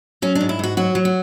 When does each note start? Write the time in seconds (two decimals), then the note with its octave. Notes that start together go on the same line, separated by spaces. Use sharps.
0.22 F#3 C#4
0.35 D4
0.41 G#2
0.49 E4
0.59 G#2 F#4
0.77 F#3 F#4
0.95 F#3
1.05 F#4